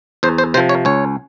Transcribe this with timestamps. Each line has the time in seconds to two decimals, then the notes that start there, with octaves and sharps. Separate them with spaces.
0.23 E2 C5
0.38 C5
0.54 C3 C5
0.57 F3
0.69 C#5
0.85 C#2 C#5